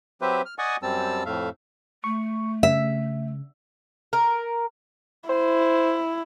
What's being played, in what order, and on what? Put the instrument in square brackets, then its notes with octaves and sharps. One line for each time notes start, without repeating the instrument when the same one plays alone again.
[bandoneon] F#3 C4 G4 B4 C5 E5
F6
D5 D#5 F#5 G#5 C#6 D#6
F#2 G3 C4 A5 E6
F2 A2 A3 E5 F5
[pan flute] A3 [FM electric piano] C#6
[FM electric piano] C#3 [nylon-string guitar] E5
[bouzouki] A#4
[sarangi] E4 [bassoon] C5